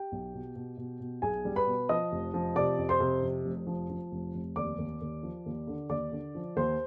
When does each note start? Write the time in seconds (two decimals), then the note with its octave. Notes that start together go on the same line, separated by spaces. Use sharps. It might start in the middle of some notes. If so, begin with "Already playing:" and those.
Already playing: G4 G5
0.12 B1
0.34 B2
0.56 B2
0.78 B2
1.00 B2
1.22 B1 G#4 G#5
1.45 G3
1.56 B4 B5
1.67 B2
1.89 F3 D#5 D#6
2.12 F1
2.34 F3
2.56 C3 D5 D6
2.78 F2
2.89 C5 C6
3.00 C3
3.22 F2
3.45 F1
3.67 F3
3.90 F3
4.12 F1
4.34 F1
4.56 D#2 D5 D6
4.78 D#2
5.01 D#2
5.23 F3
5.46 D#2
5.67 D3
5.89 D#2 D5 D6
6.12 D3
6.35 F3
6.56 D#2 C5 C6